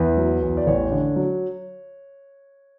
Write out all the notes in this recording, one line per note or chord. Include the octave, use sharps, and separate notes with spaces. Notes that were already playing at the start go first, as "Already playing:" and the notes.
Already playing: E2 E4 B4
F#3
E2
D5
A1 C#5
D3
F#3